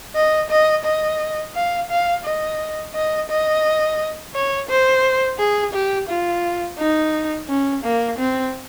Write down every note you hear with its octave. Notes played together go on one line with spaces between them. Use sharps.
D#5
D#5
D#5
F5
F5
D#5
D#5
D#5
C#5
C5
G#4
G4
F4
D#4
C#4
A#3
C4